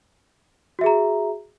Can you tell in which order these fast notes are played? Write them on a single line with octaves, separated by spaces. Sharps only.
F#4 E5 G#4 A#5